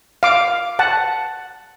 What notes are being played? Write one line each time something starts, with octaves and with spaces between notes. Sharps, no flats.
F5 D6
F#5 A5